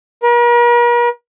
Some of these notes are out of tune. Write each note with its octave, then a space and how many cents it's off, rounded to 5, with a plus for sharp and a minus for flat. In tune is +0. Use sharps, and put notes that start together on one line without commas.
A#4 +45